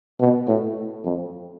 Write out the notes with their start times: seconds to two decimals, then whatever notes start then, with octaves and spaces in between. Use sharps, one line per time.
0.20 B2
0.48 A2
1.04 F2